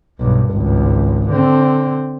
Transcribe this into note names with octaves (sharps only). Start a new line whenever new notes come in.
B1 G2
G#1 C#2
D3 C4